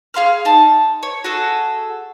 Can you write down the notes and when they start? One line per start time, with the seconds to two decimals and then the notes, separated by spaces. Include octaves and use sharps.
0.14 G#4 F5 C6 F6
0.45 D#4 A5
1.03 C#5
1.24 F#4 G#4 A4